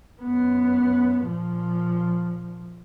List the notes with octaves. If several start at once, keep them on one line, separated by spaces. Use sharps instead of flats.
F#2 B3
A#2 F3